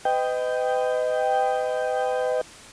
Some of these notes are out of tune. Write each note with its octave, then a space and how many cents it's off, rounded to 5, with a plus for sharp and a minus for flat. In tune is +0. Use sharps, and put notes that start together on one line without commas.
B4 +40 D#5 +0 G5 +0